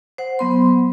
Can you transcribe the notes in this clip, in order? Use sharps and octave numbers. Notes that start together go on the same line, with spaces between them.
C5 F#5
F#3 B3 C6